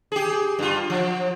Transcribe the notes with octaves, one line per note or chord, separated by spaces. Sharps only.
G4 G#4
G2 F4
F3